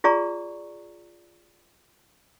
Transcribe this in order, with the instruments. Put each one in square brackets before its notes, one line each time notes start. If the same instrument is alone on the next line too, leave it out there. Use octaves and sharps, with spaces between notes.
[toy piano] F4 G#4 D5 A#5 C#6